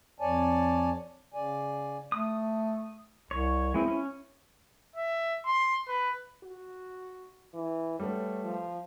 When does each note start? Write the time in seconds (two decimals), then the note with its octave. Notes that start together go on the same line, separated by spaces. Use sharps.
0.20 F2 C#5 D5 G#5 A5
1.34 C#3 D5 G#5
2.12 A3 D#6
3.31 C2 C#5
3.74 G#3 B3 C4 E4
3.88 C#4
4.96 E5
5.46 C6
5.88 B4
6.44 F#4
7.54 E3
7.99 G3 A3 B3 C#5
8.44 F3